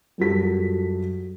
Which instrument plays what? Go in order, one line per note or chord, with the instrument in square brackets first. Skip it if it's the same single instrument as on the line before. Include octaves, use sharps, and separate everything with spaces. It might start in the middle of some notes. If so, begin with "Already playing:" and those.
[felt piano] F#2 G3 F4 F#4 A4 B6